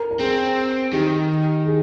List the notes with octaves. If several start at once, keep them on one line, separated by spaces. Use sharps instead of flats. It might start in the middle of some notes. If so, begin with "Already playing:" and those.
Already playing: A#4
A#4
C4 G#4
D#3 G4
G#4